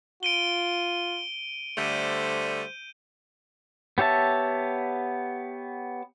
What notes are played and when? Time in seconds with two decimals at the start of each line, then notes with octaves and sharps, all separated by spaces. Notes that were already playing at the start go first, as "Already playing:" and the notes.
0.23 F4 D7 D#7 G7
1.78 D3 G3 A3 C5 G6 D#7
3.98 B3 G4 C#5 E5 A5